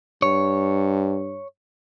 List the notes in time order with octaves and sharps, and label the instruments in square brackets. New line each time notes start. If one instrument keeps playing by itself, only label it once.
[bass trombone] G2 [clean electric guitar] C#5